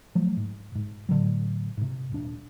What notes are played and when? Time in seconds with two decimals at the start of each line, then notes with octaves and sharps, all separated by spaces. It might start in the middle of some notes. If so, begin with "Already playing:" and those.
0.15 F3 F#3 A3
0.37 G#2
0.75 G#2
1.09 A2 D3 F#3
1.77 G#2 C3
2.11 D#1 D4